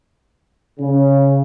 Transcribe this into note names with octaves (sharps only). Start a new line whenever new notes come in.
C#3